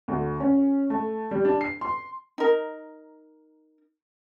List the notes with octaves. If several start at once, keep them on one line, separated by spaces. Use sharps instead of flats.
D2
C#4
A3
G3
D4
C7
C6
D#4 A#4